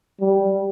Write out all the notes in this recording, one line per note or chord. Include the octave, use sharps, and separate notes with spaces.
G3